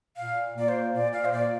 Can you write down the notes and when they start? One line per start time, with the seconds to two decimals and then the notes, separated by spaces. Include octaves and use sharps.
0.17 A#2 F5
0.55 A#3 F4 D5
0.68 C5
0.94 A#2 D5
1.13 F5
1.25 C5
1.33 A#3 F4 D5